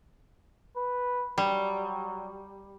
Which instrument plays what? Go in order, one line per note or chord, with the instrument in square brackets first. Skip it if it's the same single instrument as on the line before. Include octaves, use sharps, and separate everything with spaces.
[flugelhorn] B4
[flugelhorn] F#3 [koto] G3